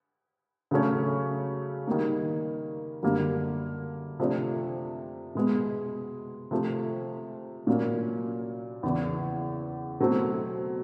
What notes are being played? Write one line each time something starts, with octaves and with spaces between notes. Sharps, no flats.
C#3 F#3 A3 C#4
D#3 G3 A#3
F#2 D3 G3 A#3 D4
C3 F3 A3 D4
B2 G#3 B3
C3 F3 A3
A#2 F#3 A#3 C#4 F#4
E2 C#3 E3
B2 F#3 A3 C4